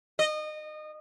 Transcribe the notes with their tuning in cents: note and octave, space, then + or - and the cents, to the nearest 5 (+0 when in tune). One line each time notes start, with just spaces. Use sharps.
D#5 -25